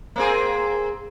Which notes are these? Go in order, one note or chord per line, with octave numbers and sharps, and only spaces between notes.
A#3 C4 G#4